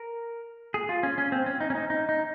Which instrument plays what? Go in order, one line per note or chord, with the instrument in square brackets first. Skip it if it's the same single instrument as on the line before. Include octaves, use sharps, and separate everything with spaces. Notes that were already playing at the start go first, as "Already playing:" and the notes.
Already playing: [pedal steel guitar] A#4
G#4
F4
C#4
C#4
C4
C#4
D#4
C#4
D#4
D#4
D#4